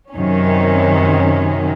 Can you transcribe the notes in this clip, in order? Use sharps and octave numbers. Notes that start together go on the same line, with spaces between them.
F#2 C3 D#3 F#3 C#4